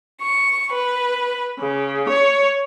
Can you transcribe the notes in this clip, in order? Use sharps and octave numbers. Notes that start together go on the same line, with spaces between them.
C#6
B4
C#3
C#5